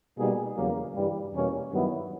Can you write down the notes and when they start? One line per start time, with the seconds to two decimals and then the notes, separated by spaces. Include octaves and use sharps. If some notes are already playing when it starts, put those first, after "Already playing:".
0.17 B2 G3 A#3 D#4 G#4
0.56 E2 C#3 F#3 A#3
0.95 G2 E3 G3
1.33 E2 B2 G3 A#3 C#4
1.71 G2 D#3 F#3 B3 E4